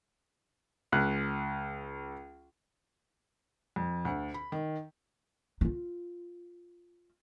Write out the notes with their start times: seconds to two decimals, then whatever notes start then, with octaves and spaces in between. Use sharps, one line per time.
0.92 C#2 F#6
3.76 F2
4.05 D2
4.34 B5
4.52 D#3
5.61 D#4 F4